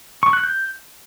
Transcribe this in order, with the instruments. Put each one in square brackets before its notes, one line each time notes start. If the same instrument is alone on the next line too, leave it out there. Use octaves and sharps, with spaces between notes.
[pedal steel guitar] C#6
F#6
G6